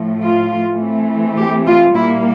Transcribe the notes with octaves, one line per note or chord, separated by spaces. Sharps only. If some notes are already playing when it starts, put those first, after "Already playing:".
Already playing: A2 F3 A3
F4
E3 A3 C4
G4
F4
A#2 G3 A#3 E4